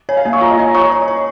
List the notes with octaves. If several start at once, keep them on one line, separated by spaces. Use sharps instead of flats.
C#5 G#5
F5
A#3 G#5
C#6
F4 A#5
D#5
F4 G#5
A#5
C#5 C#6
A#5
C#5
C#5